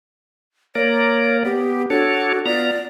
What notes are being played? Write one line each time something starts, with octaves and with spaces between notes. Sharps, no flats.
A#3 A#4 C#5 D5
B3 G4
D4 F#4 A4 C#5
B3 F4 D5 A#5